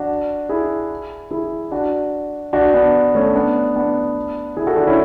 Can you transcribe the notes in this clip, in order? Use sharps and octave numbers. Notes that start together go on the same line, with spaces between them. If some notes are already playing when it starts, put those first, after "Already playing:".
Already playing: D4 F#4
E4 G#4
E4 G#4
D4 F#4
D4 F#4
B3 D4
A3 C#4
B3 D4
B3 D4
E4 G#4
F#4 A4
D4 F#4
C#4 E4